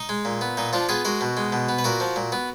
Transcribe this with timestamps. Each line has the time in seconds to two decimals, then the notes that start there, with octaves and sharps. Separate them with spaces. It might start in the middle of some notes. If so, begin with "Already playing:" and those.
Already playing: D#4
0.09 G#3
0.25 A#2
0.41 B3
0.57 A#2 D#4
0.73 F3 D4 F4
0.89 B3 F4 G#4
1.05 G#3 F#4 A#4
1.21 B2
1.37 G#3
1.52 B2
1.69 B3
1.79 B4
1.84 A#2 F#4 A#4
2.00 F3
2.16 A#2
2.32 B3